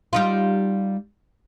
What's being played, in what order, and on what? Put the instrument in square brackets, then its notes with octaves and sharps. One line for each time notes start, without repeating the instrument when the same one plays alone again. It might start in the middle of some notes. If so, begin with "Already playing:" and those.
[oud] G3 D#4 F4